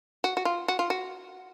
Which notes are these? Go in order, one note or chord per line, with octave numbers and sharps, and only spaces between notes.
F#4
F#4
F4
F#4
F4
F#4